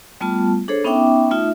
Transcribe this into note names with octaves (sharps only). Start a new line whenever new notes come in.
G3 A3 B3 F4 A5
D4 G#4 A4 C5 C#5
B3 C#4 D#4 E5 G5 D6
A3 D#4 F4 E5